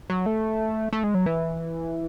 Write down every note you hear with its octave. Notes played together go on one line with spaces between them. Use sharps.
F#3
A3
A3
G#3
F#3
E3